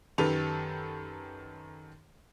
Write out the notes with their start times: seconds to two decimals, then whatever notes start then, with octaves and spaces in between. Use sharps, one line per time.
0.18 F#2 D#3 G4 A4 B4 F7